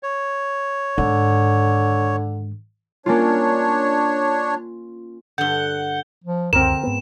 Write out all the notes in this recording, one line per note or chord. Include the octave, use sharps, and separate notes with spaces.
C#5
G#2 D3 D#3
A#3 C#4 D4 F4 C#5
G2 D3 F#5 G6 G7
F3
C#2 F#2 D3 C4 A#4 E7
G#2 B3